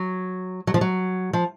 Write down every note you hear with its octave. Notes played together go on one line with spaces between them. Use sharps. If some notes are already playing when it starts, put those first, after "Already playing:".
Already playing: F#3
F#3
F3
F#3
F3